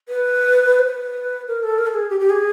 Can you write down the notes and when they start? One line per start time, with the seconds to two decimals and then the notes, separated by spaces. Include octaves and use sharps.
0.09 B4
0.79 C5
0.86 B4
1.48 A#4
1.63 A4
1.78 A#4
1.87 A4
1.94 G#4
2.10 G4
2.20 G4
2.30 G#4